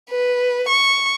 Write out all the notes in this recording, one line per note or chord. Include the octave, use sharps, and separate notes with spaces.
B4
C#6